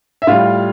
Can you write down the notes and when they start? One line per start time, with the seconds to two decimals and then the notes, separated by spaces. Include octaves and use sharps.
0.22 E5
0.27 A2 G3 F4 F5